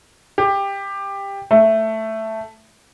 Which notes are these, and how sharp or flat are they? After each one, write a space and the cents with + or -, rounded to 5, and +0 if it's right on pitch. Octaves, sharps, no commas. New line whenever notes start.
G4 +15
A3 +5